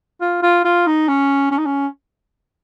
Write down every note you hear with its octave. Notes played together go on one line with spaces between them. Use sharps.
F4
F4
F4
D#4
C#4
C#4
D#4
C#4